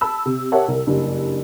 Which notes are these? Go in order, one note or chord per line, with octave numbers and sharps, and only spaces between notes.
A5 B5 E6
C3
G4 A#4 C#5 E5 F#5 A5
C2 A#4
F#1 G2